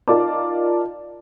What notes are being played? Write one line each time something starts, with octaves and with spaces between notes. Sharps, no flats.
D#4 F4 A#4 D5 A5 D6